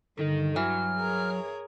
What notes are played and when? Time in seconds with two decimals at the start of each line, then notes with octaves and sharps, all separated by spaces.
0.19 G2 D3 D#3 D#4
0.56 E3 F#3 F6
0.98 G#4 A#4 C#5